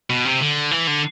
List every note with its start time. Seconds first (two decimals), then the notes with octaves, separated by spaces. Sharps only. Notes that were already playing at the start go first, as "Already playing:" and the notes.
0.10 B2
0.25 C3
0.41 D3
0.71 E3
0.87 D3